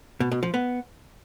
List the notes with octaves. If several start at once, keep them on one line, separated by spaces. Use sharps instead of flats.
B2
B2
F3
B3